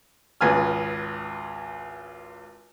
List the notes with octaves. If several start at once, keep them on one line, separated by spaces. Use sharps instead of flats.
G#1 C#2 B4 G#5 F6